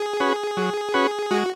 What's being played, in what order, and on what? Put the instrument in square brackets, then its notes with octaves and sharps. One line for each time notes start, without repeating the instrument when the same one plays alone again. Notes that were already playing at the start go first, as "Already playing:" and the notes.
Already playing: [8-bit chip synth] G#4
[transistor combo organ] C#4 F#4 B4
F#3
C#4 F#4 B4
[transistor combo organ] G#3 [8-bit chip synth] F#4